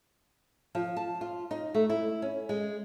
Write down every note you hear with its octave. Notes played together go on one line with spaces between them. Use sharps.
F3
A5
F4
D#4
A3
E4
C#4
G#3